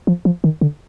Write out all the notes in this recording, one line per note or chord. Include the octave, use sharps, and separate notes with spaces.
F3
F3
D#3
D3